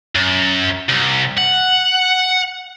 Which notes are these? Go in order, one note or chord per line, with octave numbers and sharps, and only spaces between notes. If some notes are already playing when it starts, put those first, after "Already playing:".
F#2
C2
F#5